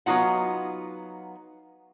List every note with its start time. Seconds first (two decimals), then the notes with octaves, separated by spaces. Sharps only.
0.06 F#3 B3 D#4 F4 F#5